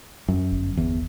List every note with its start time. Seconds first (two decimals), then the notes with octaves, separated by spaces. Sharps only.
0.28 F#2
0.52 G1
0.77 E2